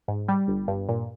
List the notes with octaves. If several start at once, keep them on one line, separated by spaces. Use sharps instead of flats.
G#2
G3
G1
G2
A#2